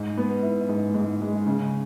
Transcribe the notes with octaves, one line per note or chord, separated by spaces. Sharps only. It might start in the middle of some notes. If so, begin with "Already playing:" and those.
Already playing: G#2
B3
E4
G#2
G#2
G#3
C#3